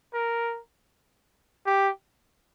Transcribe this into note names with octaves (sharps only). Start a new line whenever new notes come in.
A#4
G4